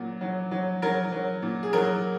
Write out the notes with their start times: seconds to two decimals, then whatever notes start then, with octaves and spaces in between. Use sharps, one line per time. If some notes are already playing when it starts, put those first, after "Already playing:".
Already playing: A#2 F#3
0.21 F#3
0.51 F#3
0.82 F#3 A#4
1.12 F#3
1.42 A#2
1.63 G#4
1.73 F#3 A#4